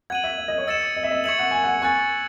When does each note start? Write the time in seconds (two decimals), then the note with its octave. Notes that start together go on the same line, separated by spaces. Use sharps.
0.10 F#5 G#6 D#7 F#7
0.24 E5
0.38 E5
0.48 D#5
0.58 C#5
0.67 D#5 E6 A6 C#7 E7
0.97 D#5
1.04 E5
1.11 D#5
1.24 E5 C#6 G#6 C#7 F#7
1.39 F#5
1.51 G#5
1.64 F#5
1.82 G#5 C#6 F#6 A6